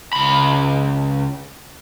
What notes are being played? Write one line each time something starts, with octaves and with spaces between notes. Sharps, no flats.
C#2 B5